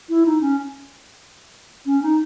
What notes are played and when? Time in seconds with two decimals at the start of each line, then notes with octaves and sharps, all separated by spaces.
0.09 E4
0.26 D#4
0.41 C#4
1.86 C#4
2.03 D#4